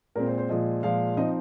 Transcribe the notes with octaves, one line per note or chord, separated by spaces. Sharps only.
A#2 G#3 C4 A#4
C5
C5
A#2 F3 G#3 D#5
A#2 F3 G#3 F5
F3 C4 D#4 D#5